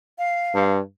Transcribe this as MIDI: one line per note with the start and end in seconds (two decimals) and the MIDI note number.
0.18 0.73 77
0.55 0.79 43